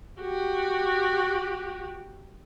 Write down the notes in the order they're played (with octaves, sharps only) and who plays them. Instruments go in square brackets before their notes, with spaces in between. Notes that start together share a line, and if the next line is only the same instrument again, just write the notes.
[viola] F#4 G4